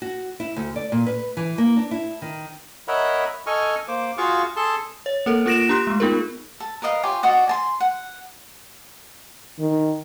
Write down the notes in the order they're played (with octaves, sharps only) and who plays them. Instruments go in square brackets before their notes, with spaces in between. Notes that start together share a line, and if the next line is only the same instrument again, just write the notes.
[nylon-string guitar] F#4
E4
D2
D5
A#2
B4
E3
A#3
D4
E4
D#3
[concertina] A#4 C#5 D#5 E5 F#5 B5
A4 D#5 G#5 C#6 F6
A#3 C5 D6
F4 F#4 G#4 F5 C#6
G#4 A4 A5 C6
[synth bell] C#5
A#3 A4 A#4
A#3 F4 A#4 A#6 D7 E7
D4 G4 C6 F#6
G#3 A3
B3 D#4 F4 G#4 A#4
[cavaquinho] A4
A#4 B4 D#5 F5
F4 G4 C#5 G#5
F#4 D5 D#5 F#5
G#5 A5 C6
F#5
[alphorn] D#3